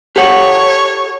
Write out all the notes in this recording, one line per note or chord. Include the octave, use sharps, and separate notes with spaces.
G4 A4 C#5 F#5